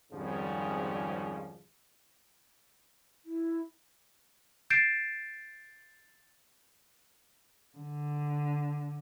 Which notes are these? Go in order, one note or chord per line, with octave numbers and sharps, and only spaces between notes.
G#1 F2 G#2 C#3 F3 G3
E4
G6 A6 C7 D7 E7
D3